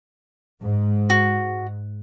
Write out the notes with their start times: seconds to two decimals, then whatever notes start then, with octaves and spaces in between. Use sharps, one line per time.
0.60 G#2
1.10 F#4